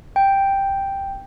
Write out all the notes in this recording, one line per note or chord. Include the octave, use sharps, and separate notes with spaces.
G5